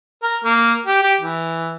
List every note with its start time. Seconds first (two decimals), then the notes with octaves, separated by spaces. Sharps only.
0.23 A#4
0.44 A#3
0.86 G4
1.03 G4
1.21 E3